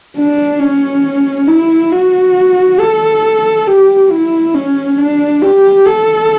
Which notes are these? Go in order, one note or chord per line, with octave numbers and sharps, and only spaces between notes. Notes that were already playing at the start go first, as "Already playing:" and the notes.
D4
C#4
E4
F#4
A4
G4
E4
C#4
D4
G4
A4